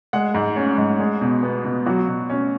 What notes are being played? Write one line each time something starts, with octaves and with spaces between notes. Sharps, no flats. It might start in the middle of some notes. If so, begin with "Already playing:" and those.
G#3 F#5
G#2
C#4
G#2
G#3
B2
B3
B2
F#3 F#4
B2
C#4